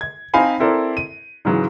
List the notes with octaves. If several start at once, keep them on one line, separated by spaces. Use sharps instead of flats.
G#6
C4 D#4 C5 F5 G#5 B5
C4 E4 A4 A#4 C5 D5
D#7
G#2 C#3 E3 F#3